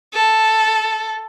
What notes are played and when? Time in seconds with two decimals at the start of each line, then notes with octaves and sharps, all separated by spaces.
0.14 A4